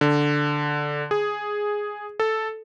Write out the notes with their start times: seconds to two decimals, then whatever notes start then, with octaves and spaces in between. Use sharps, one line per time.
0.01 D3
1.11 G#4
2.20 A4